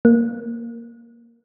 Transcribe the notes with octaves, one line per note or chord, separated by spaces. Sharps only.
A#3